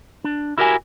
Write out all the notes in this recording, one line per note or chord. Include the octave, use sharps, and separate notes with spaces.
D4
E4 F#4 G4 A#4 D#5 G#5